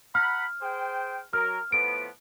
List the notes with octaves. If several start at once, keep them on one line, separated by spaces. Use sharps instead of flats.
F#5 A#5 B5 F6
G#4 C5 G5
F#3 A#4 F6
A2 F3 B3 D7